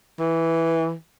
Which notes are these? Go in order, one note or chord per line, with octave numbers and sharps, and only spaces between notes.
E3